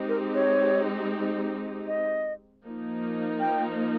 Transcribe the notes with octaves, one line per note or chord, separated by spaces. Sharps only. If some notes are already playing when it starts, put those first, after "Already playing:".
Already playing: G#3 C4 D#4 G4
A#4
C#5
D#5
F3 A#3 D#4
G5